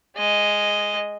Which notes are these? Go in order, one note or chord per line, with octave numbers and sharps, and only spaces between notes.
G#3 D#5